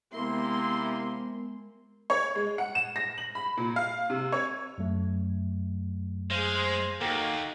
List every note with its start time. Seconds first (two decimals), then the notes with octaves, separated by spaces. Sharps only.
0.14 C3 G#3 A#3 B3 E4 A#4 C6
2.10 C#5
2.35 G#3
2.58 F#5
2.75 E7
2.96 A#6
3.18 F#7
3.35 B5
3.57 A#2
3.76 F5
4.10 C3
4.32 C#5
4.78 F#2 F#3 A3
6.31 G#3 G#4 C5 F5
7.01 D#2 A#3 D#4 F#4 A4 G5